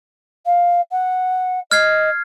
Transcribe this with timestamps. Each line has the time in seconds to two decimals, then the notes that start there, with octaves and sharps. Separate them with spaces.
0.46 F5
0.92 F#5
1.71 D#5 F6 G#6 C7